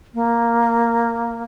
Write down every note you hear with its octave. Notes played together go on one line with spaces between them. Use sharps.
A#3